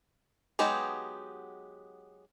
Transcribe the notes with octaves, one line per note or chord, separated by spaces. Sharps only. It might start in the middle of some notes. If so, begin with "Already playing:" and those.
F#3 G#3 B3 D#4 G4